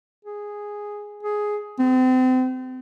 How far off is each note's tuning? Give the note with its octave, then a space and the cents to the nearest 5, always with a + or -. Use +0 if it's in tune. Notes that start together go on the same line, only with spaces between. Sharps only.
G#4 -5
G#4 +5
C4 -35